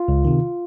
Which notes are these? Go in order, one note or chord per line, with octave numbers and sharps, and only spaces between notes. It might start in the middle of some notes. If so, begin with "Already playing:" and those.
Already playing: F4
C#2
C3 D#3